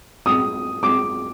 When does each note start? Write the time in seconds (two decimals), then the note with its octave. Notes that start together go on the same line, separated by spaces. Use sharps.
0.26 D#6
0.83 D6